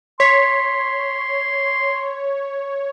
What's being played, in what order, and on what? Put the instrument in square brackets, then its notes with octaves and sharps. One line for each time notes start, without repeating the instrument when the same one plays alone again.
[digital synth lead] C#5 [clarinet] C6 [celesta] B6